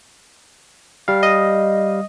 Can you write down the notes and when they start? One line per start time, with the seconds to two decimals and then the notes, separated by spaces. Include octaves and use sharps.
1.08 G3 F5
1.23 D#5